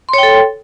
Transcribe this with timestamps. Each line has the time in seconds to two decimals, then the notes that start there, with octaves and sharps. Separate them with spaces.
0.09 C6
0.13 C#5
0.18 G5
0.23 A4